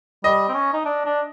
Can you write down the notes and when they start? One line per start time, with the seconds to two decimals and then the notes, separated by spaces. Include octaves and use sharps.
0.24 G3 D#5
0.49 C4
0.54 C#4
0.73 D#4
0.85 D4
1.05 D4